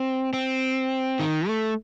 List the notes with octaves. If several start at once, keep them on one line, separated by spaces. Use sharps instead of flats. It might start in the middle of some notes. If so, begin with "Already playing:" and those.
Already playing: C4
C4
D#3
A3